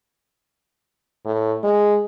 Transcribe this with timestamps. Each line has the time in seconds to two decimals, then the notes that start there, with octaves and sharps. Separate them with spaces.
1.25 A2
1.63 G#3